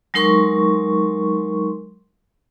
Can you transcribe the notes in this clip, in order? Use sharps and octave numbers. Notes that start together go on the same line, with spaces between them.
F#3 G#3 D#4 A#4 C6 C#6